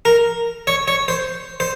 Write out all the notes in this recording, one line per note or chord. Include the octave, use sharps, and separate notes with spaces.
A#4
C#5
C#5
C5
C5